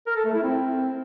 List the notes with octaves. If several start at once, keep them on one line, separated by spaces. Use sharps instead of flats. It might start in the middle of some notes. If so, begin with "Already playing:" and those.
A#4
A4
A3
E4
C4